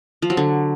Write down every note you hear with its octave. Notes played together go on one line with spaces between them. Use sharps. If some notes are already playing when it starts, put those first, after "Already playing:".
F3
F#3
D3